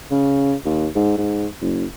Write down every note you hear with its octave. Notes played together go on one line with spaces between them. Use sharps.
C#3
D#2
G#2
G#2
F#1